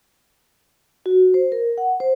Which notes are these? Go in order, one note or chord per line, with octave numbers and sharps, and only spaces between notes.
F#4
C5
A#4
F#5
C5